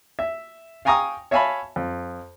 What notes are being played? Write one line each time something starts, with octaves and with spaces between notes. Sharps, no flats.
E5
F5 G5 G#5 A#5 C#6 D#6
C#5 E5 F5 G#5 A5 B5
F2